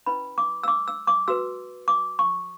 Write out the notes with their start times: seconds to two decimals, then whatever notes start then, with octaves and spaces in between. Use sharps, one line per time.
0.06 C#4 E4 B4 B5
0.38 D6
0.63 E6
0.68 D6
0.88 E6
1.07 D6
1.28 F#4 B4 E6
1.88 D6
2.19 C#6